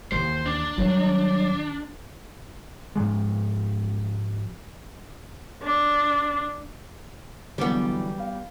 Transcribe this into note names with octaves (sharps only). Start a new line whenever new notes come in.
D#2 E3 C5
D4
D#3 F#3 G3 C#5
G#2 F3 G#3
D4
D3 E3 F#3 G3 B3
F5